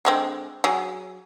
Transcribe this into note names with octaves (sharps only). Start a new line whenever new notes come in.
D3 G#3 C4
F#3 G#4